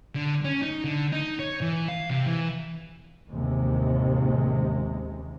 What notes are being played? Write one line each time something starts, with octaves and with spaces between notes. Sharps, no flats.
D3
C#4
D#4
D3
D#4
C#5
E3
F5
C3
E3
A1 D#2 C3 G#3